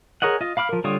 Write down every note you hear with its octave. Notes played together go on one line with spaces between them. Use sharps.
G#4 A#4 C#5 D#5 F#5
F4 D#5
F5 B5 D6 F6
F3 A#4
D3 G3 F4 C#5 D#6